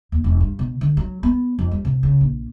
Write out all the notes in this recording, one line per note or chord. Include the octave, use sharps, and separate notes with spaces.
D#2
E1
G2
B2
D3
F#3
B3
F2
G3
C3
C#3
A#1